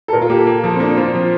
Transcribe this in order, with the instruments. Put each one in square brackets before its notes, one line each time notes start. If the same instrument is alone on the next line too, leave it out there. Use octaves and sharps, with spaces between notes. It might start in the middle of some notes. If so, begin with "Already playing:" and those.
[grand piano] A4
[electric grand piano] A#2 [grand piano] A#4
[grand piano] F4
[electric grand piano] A#3 [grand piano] G4
[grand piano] A4
[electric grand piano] A#3
[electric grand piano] F3 [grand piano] A4
[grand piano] C4
[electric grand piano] A#3 [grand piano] D4
[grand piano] C4 [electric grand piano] F4
[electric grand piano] F3